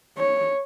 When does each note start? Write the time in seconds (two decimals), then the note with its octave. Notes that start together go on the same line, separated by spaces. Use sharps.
0.18 C#5